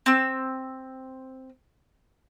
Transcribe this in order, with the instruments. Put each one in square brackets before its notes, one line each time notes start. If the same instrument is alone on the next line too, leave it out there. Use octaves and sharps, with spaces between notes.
[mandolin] C4 E6